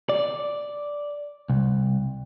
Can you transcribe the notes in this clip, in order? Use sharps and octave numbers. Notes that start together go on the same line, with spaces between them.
D5
C2